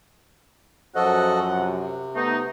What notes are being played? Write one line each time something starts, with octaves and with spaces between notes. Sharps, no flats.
F#2 F3 F#4 A4 D#5 F#5
C3
A3 B3 D#4